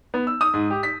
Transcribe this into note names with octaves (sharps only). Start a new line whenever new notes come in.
B3
E6
D#6
G#2
G4
B6